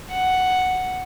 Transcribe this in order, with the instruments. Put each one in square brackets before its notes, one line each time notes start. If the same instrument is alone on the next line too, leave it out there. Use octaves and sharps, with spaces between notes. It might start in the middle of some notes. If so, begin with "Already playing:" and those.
[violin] F#5